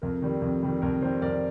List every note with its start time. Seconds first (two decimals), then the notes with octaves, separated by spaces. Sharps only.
0.02 F2 A#4
0.22 D#3 G3
0.42 F2
0.63 D#3 G3
0.82 F2 A#4
1.02 D#3 G3 C5
1.22 F2 A#4 D5